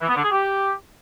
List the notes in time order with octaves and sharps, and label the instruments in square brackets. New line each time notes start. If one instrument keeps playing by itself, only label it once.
[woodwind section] E3
B3
D3
G#4
G4